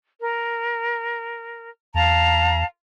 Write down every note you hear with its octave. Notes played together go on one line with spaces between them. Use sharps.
A#4
E2 F5 A5 A#5